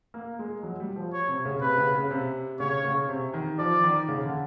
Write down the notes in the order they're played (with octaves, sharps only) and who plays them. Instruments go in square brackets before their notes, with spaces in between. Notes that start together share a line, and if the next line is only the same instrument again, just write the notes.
[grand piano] A#3
G#3
F#3
G3
F3
[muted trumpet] C#5
[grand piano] C3
C#3
[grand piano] C3 [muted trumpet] B4
[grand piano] C#3
C#3
C3
[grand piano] C#3 [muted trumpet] C#5
[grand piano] C#3
C3
D#3
[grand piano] F3 [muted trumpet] D5
[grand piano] D#3
C#3
D3